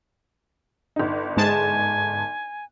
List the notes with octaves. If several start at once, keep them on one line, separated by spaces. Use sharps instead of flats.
G1 D#4
G#2 G#3 G#5 A5